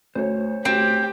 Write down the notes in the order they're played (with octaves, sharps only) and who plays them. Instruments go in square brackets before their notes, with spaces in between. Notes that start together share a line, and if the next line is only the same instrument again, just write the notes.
[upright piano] D2 [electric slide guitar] C5 C#5
[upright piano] D2 [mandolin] C4 [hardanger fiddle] G4